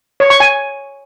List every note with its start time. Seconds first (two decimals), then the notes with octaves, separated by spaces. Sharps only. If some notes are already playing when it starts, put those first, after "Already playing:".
0.20 C#5
0.30 C#6
0.40 G#5